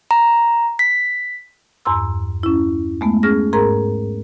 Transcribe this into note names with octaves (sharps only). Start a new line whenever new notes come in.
A#5
B6
E2 G2 A#5 C6 E6
C#4 E4
G#3 A3 B3
C#4 G#4 F6 A#6
G#2 G#4 A#4 A#5